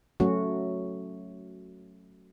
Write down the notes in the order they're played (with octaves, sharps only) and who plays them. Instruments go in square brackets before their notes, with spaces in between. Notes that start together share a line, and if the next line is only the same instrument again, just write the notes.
[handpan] F#3 A3 C#4 F#4